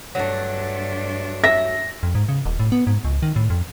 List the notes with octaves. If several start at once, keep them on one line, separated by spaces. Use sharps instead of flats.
G2 F#3 A3 D4
E5 A#6
F2
G#2
C#3
D#1
A2
B3
G#2
C#2
D#3
A2
F2